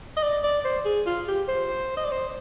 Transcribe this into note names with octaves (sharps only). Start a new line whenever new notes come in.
D#5
D5
D5
C5
G#4
F4
G4
C5
D#5
D5
C5